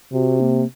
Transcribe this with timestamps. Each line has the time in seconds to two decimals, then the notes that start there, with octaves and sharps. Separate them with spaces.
0.12 C3 F#4
0.40 A#3